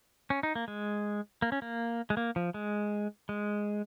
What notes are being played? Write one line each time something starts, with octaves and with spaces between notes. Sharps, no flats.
C#4
D#4
A#3
G#3
A#3
C#4
A#3
G#3
A#3
F3
G#3
G#3